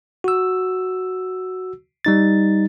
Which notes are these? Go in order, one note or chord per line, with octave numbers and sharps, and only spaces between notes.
F#4 E6
G3 D#4 A6